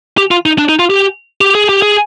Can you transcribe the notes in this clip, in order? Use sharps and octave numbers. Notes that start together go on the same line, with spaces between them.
G4
F4
D#4
D4
D#4
F4
G4
G4
G#4
G4
G#4